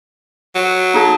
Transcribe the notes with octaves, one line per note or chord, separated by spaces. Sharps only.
F#3
D#4 G#4 A5